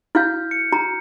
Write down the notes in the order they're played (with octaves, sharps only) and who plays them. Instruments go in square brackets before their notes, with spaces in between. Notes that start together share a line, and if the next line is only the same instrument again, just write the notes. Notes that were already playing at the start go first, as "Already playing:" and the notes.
[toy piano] E4 F#4 F5 [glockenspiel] F6 G6
[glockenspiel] C#7
[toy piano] F#4 A#5